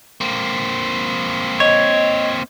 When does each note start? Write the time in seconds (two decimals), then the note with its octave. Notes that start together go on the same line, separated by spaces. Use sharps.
0.21 A#3 C4
1.60 C#5 D#5